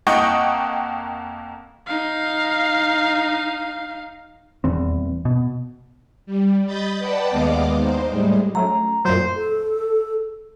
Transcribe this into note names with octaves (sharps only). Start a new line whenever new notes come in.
F2 A#3 D#5 F#5 G5 C#6
D#4 F5
D#1 E2 C4
B2
G3
D#5 B5 G6 A6
B4 D5 F#5 G5 A5
D#2 G#3 B3 D#5 F5 D6
D#4 C5
A2 G3 G#3
F#3 A3 C#4 A#5
F#2 A#2 F#3 C5
A4